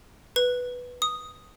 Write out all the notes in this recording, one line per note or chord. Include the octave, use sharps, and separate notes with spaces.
B4
D#6